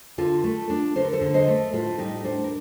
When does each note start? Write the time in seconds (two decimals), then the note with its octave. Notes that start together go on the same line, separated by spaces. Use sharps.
0.18 D3 F4 A4
0.44 A3
0.70 D4
0.96 D3 C5
1.04 A#4
1.13 A4 C5
1.21 D3
1.34 C5 D#5
1.48 A3
1.73 A2 F4 A4
1.98 G3 D#4 G4
2.24 D4 A4 C5
2.44 A#4